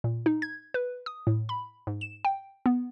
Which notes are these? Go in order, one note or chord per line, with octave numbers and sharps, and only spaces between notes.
A#2
D#4
G#6
B4
D#6
A2
B5
G#2
E7
G5
B3